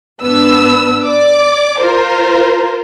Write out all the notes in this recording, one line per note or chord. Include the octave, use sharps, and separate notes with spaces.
G#1 B3 D4 B4 E6
D5 D6
F4 A#4 C5